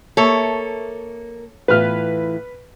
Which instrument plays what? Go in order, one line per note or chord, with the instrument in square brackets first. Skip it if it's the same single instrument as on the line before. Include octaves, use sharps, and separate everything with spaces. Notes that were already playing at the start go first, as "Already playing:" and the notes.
[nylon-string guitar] A#3 E5 [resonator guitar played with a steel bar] A4 C#5
[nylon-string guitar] A2 E3 F4 [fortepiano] B4 F6